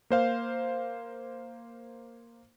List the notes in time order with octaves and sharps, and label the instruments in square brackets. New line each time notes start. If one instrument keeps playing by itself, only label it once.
[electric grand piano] A#3 C5 F5